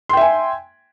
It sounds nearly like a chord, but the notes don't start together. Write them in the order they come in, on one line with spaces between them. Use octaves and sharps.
C6 G5 E5 G#5